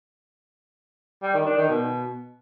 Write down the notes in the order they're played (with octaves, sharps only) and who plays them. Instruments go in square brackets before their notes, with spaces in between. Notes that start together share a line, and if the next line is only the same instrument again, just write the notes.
[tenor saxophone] G3
D#3
D4
D#3
B2